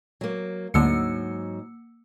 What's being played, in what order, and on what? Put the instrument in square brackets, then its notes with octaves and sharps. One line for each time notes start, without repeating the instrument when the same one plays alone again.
[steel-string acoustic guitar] F#3 A#3
[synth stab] D2 D3 [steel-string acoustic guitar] G#2 F#3 [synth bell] A#3 E6 C#7